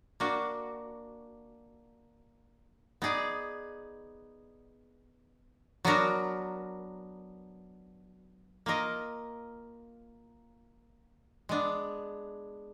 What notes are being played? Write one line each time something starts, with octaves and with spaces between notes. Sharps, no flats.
A#3 D4 F#4
B3 D#4 G#4 D5
F#3 B3 D4 F#4 A#4
A#3 F4 A#4 D#5
G#3 B3 D4